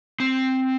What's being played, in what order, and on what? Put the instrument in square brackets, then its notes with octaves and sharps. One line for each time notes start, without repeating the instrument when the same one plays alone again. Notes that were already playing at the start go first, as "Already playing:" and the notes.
[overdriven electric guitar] C4